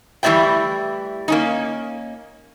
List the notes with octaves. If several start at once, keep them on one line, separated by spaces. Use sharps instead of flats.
E3 G3 A3 D5 E5 G5
A#3 C#4 D#4